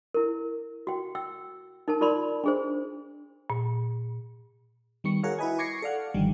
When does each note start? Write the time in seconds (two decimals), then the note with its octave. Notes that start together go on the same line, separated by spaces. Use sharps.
0.14 E4 A#4
0.87 F#4 G5
1.15 G5 E6
1.88 D#4 A#4 A5
2.01 F4 A#4 D5 B5 C6
2.44 D4 G#4 C5
3.50 A#2
5.04 D#3 G3 B3 C#6 C#7
5.23 F#4 G#4 A#4 C#5 F5
5.39 E4 F#4 B4 D#5 G#5
5.59 C#6 D6 G#6 A#6 C7 C#7
5.82 A4 D5 F5 F#5
6.14 G#1 D3 D#3 F3 G3